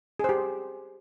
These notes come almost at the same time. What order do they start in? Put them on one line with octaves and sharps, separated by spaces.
G#4 C5 G4